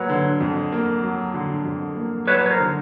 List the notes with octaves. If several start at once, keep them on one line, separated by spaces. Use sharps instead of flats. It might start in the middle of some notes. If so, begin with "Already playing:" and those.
Already playing: F#3 A#3 B4 C#5
D3
F2
A#3
F#3
D3
F2
A#3
F#3 B4 C#5
C#5
A#4 C5
D3